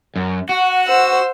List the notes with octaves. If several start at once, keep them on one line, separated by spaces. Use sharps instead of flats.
F#2
F#4 F#5
C5 E6